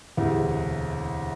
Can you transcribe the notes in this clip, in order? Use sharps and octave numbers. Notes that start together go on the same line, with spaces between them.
E1 D2 C3 E3